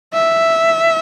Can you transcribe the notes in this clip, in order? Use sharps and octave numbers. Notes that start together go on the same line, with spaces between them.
E5